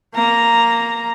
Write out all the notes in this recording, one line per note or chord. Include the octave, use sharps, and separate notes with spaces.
A#3 A#5